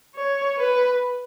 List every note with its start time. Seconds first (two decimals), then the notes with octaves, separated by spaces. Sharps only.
0.16 C#5
0.58 B4